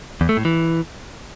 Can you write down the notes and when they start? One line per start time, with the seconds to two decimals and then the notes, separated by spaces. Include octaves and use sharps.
0.21 E2
0.29 A3
0.37 A2
0.45 E3